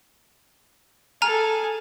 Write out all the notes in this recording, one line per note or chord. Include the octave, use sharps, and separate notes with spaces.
G#4 A4 G#5 A#5 F6